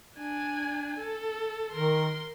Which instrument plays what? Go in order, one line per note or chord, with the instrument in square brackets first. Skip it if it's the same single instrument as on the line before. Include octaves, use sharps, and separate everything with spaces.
[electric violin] D4 G#5
A4
[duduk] D#3 [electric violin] A#4 C6